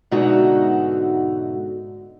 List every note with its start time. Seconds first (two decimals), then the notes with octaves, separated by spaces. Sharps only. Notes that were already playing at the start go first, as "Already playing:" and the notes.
0.11 G#2 B2 D3 D#4 F#4 E5